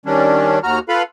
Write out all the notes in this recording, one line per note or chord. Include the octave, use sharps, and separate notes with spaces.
D#3 G3 C#4 D4
D#2 F#4 A#5 F6
F4 A4 B4 F5 B5